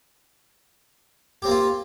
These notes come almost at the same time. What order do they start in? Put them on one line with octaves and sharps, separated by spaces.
G4 C4 A#3 F4